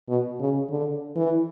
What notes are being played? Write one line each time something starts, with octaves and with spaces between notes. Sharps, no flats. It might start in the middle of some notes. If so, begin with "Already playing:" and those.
B2
C#3
D3
E3